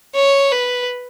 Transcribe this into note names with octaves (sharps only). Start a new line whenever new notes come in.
C#5
B4